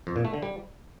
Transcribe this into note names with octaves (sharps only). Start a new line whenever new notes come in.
F2
A#2
A3
D3
G3